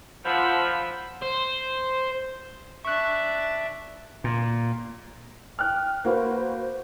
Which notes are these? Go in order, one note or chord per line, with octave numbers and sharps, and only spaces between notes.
F3 F#5 B5 E6
C5
D4 E5 C#6 F#6
A#2
G5 F6 F#6
A#3 F#4 B4 C5